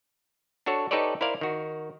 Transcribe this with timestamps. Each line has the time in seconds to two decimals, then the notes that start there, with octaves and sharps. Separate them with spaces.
0.66 D4 F#4 A4 C#5
0.91 D#4 G4 A4 B4 C#5 D5
1.21 E4 A#4 C5 D5 F5
1.41 D#3 F#4